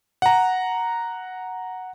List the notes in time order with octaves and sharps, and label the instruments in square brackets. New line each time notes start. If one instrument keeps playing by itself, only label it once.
[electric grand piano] F#5 A#5